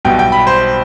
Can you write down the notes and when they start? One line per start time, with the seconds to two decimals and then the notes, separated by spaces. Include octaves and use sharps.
0.05 B1 B2 G3 G5
0.19 G5
0.32 B5
0.47 C5